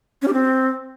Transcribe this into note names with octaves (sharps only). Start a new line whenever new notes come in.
C#4
G4
C4